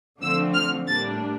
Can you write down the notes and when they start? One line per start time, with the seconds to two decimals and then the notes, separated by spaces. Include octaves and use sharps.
0.21 D3 F3 A3 C4 E6
0.54 F6
0.87 A2 G3 A#3 D4 A6